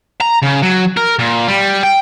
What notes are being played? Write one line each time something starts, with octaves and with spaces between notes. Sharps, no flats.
A#5
C#3
F#3
A#4
A#2
G3
G5